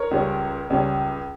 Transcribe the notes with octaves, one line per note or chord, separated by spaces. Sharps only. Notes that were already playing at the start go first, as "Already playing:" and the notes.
Already playing: A#4 C#5
C#2 C#3 G3 C#4
C#2 C#3 G3 C#4